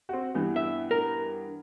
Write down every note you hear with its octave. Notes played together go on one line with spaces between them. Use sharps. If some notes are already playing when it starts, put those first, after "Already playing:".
C4 F#4
G2 E3 B3
E5
A#4